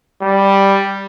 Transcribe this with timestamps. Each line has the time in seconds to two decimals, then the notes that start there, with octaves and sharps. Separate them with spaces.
0.22 G3